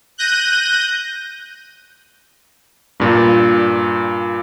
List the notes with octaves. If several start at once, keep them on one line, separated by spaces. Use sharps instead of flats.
F#6 G6 A#6 D#7
G2 A#2